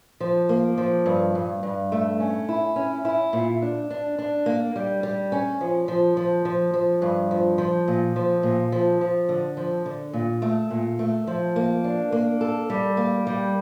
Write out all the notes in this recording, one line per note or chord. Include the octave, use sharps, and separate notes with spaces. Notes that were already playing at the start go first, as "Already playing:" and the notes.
F3
A#3
F3
G2
G2
G2
A3
C#4
E4
C#4
E4
A#2
D4
D4
D4
A#3
G3
G3
C#4
F3
F3
F3
F3
F3
G2
F3
F3
A#2
F3
A#2
F3
F3
D3
F3
D3
A#2
A3
A#2
A3
F3
A#3
D4
A#3
A4
G3
A#3
G3